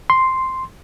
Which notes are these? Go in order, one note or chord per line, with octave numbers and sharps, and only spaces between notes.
C6